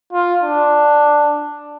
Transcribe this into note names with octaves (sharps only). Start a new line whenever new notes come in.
F4
D4